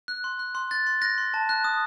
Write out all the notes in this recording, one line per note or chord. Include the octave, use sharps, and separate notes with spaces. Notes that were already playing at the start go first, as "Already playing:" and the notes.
F#6
C6
F#6
C6
F#6 A6
C6
F#6 A#6
C6
A5
F#6
D#6